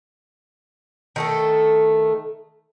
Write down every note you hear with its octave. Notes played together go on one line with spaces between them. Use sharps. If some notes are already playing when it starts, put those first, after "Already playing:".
D#3 A3 A4